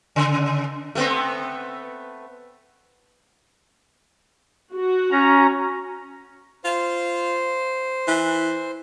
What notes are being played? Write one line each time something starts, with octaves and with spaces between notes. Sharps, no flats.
C#3
A3 B3 C4
F#4
C#4 A#5
F4 C5
E3